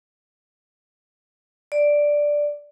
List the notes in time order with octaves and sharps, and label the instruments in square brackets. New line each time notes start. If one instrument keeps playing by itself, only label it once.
[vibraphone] D5